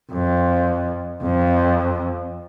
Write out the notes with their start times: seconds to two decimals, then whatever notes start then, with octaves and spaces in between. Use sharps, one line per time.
0.11 F2
1.23 F2